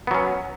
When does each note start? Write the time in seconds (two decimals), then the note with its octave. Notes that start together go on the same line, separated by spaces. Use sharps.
0.07 B3
0.11 F#3
0.15 C#4